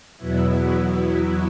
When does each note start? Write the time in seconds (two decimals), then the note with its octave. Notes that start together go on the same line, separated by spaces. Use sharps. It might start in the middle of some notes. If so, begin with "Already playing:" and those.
0.17 E2 B2 F#3 B3 E4